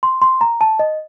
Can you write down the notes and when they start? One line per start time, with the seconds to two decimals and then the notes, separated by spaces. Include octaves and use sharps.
0.03 C6
0.22 C6
0.41 A#5
0.61 A5
0.79 D#5